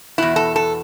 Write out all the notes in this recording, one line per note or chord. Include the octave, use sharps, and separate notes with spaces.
E2 B2 E4
A4
A4